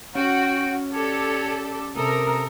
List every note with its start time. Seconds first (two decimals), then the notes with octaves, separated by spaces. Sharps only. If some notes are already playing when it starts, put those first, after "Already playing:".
0.15 C#4 F#4 G5
0.94 G4 A4 C#5 D5
1.96 C3 A4 A#4 D#6